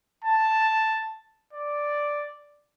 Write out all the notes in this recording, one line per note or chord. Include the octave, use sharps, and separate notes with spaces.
A5
D5